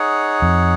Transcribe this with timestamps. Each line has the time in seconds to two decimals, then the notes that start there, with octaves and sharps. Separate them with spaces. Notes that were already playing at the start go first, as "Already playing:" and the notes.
Already playing: D#4 G#4 C#5 F#5
0.42 F2